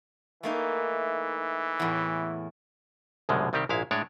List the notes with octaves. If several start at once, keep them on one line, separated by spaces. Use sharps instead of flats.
E3 A3 A#3 D#4
E2 A2
C2 F#2 B2 D3 F3 G#3
C2 D#3 G3 C4 G4
A#1 G#2 G#3 E4 F5
A2 G#3 D4 C#5 D5